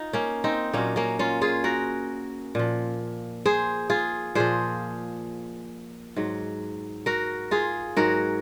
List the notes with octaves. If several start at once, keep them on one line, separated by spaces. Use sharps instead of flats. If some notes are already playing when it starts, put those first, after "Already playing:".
Already playing: D#4 F4
A#3 C#4
C4 D#4
A#2 F#3 A#3 C#4
A#3 C#4
C#4 F4
F4 G#4
F#4 A#4
A#2 F3
G#4 C5
F4 G#4
A#2 F3 G#4 C5
G#2 F#3
F#4 A#4
F4 G#4
G#2 F#3 F#4 A#4